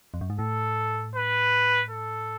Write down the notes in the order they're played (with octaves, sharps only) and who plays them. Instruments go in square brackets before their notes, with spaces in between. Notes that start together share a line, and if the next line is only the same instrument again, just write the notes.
[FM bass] F2
F#2
G#2
[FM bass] A2 [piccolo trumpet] A4
[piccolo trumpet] B4
A4